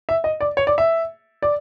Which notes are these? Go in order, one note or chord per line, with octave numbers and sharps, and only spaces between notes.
E5
D#5
D5
C#5
D5
E5
D5